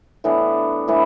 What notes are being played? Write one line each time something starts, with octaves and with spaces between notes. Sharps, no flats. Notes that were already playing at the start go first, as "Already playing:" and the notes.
A2 E3 B3 D4
A2 E3 B3 D4